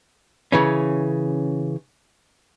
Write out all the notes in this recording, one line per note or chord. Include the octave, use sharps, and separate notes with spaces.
C#3 E3 C#4